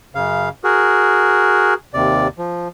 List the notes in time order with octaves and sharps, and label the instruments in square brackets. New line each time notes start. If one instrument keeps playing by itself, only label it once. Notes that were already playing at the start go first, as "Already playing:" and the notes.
[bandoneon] F#2 C#3 F5
F#4 G#4 A#4
D#2 C3 D5
F3